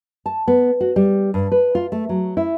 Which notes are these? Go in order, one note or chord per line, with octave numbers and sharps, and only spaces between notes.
A5
B3
F#4
G3
G2
B4
F4
A3
F#3
E4